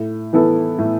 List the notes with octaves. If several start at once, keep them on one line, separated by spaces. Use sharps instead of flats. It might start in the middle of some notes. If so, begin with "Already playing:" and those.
Already playing: A2
E3 B3 E4 A4
A2